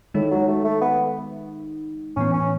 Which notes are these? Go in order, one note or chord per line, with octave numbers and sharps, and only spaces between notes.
A2 D#3 G#3 D#4
F#3
A3
A3
B3
A2 E3 B3 C#4
C#4